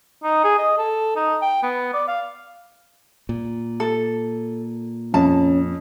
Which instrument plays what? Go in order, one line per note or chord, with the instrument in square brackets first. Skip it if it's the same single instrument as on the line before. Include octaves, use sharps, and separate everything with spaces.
[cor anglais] D#4
G#4
D#5
A4
D#4
G5
B3
D5
F5
[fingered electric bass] A#2
[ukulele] A4
[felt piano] F2 [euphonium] C#4 [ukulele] A5